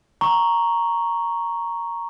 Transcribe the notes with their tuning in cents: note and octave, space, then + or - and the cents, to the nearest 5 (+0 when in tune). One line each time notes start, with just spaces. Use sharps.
A#5 +0 C#6 +0